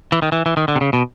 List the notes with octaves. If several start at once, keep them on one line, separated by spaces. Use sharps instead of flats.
E3
D#3
E3
E3
D#3
D3
C3
C#3
B2